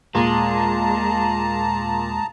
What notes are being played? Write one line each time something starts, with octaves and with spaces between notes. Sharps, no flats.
D#2 A#2 G#3 A5 A#5